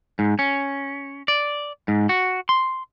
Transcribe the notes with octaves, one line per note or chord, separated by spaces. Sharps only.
G#2
C#4
D5
G#2
F#4
C6